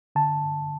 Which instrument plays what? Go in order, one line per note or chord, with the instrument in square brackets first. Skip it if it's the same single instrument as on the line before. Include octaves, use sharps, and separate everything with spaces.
[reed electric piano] D3 A5